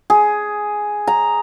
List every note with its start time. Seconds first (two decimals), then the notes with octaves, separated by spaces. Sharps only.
0.10 G#4
1.07 A#5